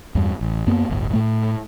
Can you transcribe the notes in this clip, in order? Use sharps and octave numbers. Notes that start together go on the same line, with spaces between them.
E2 G2
A1
F#2 A#3 B3
D1 G1
A2 A3